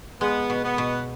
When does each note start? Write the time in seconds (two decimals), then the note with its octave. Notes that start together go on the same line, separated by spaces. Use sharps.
0.21 G#3 B3
0.50 B2
0.64 B3
0.78 B2